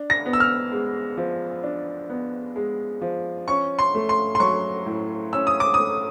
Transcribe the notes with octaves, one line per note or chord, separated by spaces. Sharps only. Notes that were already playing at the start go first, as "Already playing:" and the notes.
Already playing: D4
A#6
B3
E6
F6
G#3
F3
D4
B3
G#3
F3
C#4 C#6
C6
A3
C6
C6
F#3 C#6
A2
C#4 E6
D#6
D6
A3 D#6